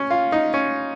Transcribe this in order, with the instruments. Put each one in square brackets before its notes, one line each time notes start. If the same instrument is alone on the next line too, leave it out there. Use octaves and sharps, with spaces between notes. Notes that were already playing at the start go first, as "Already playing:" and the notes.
Already playing: [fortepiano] C#4
F4
D#4
C#4